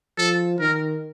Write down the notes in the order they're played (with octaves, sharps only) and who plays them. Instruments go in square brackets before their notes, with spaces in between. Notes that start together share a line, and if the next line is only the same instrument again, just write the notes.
[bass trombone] F3 [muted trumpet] A4
[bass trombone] D#3 [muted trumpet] A#4